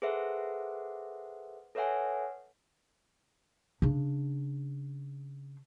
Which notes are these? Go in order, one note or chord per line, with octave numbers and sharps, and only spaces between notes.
G#4 A4 B4 C5 E5 F#5
A4 B4 C#5 E5 F#5 G#5
C#3 D4